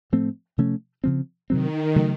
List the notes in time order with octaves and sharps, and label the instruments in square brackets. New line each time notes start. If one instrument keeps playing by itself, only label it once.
[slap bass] A2 F3 A3 C4
C3 F3 A3 C#4
C#3 F3 C4
[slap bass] C3 F#3 C4 [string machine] D#3
[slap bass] C#3 F#3 A3